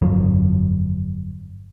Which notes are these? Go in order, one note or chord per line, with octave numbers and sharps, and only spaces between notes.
G1 F2 F3 F#3